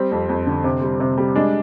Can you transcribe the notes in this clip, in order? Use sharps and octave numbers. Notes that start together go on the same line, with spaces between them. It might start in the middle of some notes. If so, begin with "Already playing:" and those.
Already playing: G3 C4
F2
F2
D3
C3
G3
C3
G3
G#3 D4